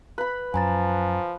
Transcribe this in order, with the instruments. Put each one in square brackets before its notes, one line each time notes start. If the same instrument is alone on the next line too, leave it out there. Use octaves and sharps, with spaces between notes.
[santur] B4 B5
[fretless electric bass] F#2 [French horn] F3 [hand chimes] G#5 A#5 A6